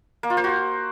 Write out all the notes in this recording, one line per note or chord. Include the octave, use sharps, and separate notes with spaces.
A#3
F4
C5
F#4